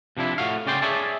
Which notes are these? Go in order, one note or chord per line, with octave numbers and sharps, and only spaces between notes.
C3 F3 D4 E4
A2 F#4 F5
C#3 C#4 D5 G5 C6
G#4 C#5 D5 E5 A5